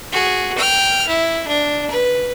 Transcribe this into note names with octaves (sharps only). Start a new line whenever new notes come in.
F#4 G#4
G5 F6
E4
D4
B4